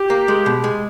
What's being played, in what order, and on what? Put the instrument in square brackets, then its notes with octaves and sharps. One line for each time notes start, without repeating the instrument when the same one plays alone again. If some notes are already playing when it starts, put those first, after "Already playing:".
Already playing: [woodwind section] G4
[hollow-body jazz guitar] A#3
G#3
B2
G#3